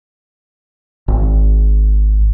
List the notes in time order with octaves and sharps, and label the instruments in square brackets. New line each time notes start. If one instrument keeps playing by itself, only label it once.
[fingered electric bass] G#1